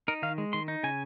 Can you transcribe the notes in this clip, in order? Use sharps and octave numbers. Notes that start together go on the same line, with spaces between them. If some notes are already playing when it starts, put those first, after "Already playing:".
D#4 A#4
D#3 F5
G#3
D#3 C6
D#4
C#3 G#5